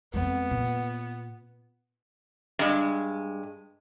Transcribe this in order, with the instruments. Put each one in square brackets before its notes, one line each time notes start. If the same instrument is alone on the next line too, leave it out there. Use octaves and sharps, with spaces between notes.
[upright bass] F2 G#3 [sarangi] B3
[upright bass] A#2
[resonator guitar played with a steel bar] G2 G#3